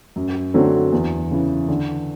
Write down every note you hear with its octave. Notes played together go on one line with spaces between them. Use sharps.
F#2
D3 F#3 A3 C4
E2
C#3 E3
D3